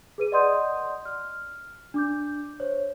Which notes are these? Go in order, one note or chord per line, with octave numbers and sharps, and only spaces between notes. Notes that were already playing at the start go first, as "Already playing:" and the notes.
G#4 B4 D#7
D5 D#5 F#5 C6 D#6 G6
F6
D4 D6 G6
C5 C#5